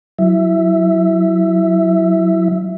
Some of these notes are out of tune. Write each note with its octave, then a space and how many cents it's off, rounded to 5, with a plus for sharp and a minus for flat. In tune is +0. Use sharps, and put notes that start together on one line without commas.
F#3 +0 E4 +0 E5 +0